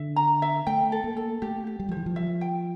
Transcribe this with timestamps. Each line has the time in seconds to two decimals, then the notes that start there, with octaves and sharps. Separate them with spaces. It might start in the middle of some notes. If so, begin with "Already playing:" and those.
Already playing: D3 E5
0.16 A#5
0.42 E5
0.67 A3 G5
0.92 A4
1.04 A#3
1.17 A4
1.42 A3 G4
1.67 G4
1.80 G3
1.89 F3
1.91 C5
1.97 E3
2.06 F3
2.16 E5
2.41 G5